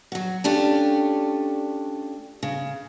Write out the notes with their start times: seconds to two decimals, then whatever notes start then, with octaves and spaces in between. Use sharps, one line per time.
0.12 F#3 F#4
0.44 A3 C#4 D4 F4 G4
2.43 C#3